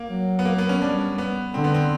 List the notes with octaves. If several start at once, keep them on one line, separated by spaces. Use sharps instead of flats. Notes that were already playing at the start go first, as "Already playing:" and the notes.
Already playing: A#3
F#3
B3
A#3
B3
C#4
G3 D4
B3
D3 C4
B3
C4